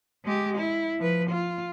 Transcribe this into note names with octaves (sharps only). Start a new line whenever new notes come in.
G#3 G4
E4
F3 B4
F4